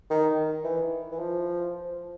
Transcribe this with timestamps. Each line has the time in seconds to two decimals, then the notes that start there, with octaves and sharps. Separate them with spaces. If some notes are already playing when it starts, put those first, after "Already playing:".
0.11 D#3
0.64 E3
1.12 E3
1.19 F3